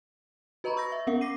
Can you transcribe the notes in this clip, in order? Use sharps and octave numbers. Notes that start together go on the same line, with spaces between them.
F#4 B4 D#5 A#5 B5 C#6
C#6 E6 G6 A#6
E5
B3 C#4 A#4 F5 F#5
D6 A#6 C7 D#7